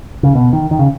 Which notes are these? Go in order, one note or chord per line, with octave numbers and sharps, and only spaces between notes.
C#3
B2
D#3
D#3
C#3